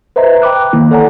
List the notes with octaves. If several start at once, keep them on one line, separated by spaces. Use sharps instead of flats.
B4 C5 D#5 E5 A#5
G5 B5 D6 F#6
D#3 A#3 E4
A4 C#5 D5 F#5 G#5 A#5